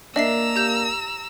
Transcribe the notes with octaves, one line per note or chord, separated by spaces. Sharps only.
A#3 D4 D#5 E5 A#5 E6 C7
G4 G6 F7